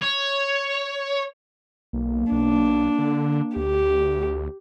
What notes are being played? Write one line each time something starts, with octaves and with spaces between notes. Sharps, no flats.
C#5
B1 A#3
B1 D4
D3
D2 G4